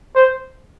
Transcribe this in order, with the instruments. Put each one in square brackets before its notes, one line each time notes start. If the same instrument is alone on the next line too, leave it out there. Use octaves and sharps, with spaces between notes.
[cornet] C5